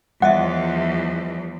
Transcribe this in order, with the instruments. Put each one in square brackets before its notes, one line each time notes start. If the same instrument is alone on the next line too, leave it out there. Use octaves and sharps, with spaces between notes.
[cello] E2 F3 [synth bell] G3 D#5 E5 [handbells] F#5